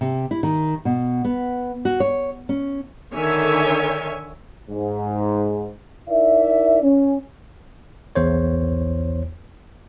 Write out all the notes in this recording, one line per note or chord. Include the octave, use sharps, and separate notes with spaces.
C3
E4
D#3
B2
B3
F#4
C#5
C#4
D3 D#3 C#5 E5 G#5
G#2
D#4 E4 A#4 D5 E5
C#4
B1 E2 C5 C#5